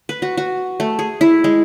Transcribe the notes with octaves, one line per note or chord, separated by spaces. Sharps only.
B4
F#4
F#4
A3
G#4
E4
G#3